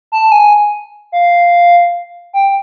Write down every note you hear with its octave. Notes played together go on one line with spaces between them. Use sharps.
A5
G#5
F5
G5